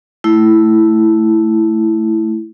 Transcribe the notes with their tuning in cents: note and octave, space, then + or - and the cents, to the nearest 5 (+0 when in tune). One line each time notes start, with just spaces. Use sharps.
A3 +0 E4 +0